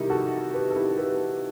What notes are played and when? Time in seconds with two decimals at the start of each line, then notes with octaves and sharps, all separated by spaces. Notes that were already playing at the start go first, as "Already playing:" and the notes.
Already playing: C3 D#3 G3 D#4 E4 G4
0.10 F#4 A4
0.53 G4 B4
0.70 A4
0.75 E4 G4
0.98 G4 B4